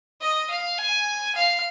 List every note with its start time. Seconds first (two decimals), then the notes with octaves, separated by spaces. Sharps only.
0.21 D#5
0.50 F5
0.78 G#5
1.35 F5